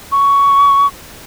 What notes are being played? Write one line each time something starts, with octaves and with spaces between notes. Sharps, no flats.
C#6